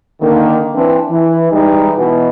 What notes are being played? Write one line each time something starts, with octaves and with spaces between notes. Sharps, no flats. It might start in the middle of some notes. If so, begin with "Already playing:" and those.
D3 D#3 A#3
E3 C4 D4
E3
E3 G3 G#3 D#4
B2 E3